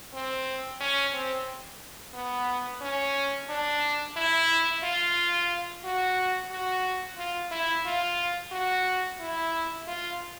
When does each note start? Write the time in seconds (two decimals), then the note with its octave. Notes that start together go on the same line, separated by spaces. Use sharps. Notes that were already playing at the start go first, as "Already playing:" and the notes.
0.13 C4
0.80 C#4
1.14 C4
2.14 B3
2.81 C#4
3.49 D4
4.16 E4
4.83 F4
5.84 F#4
6.51 F#4
7.17 F4
7.51 E4
7.85 F4
8.52 F#4
9.20 E4
9.87 F4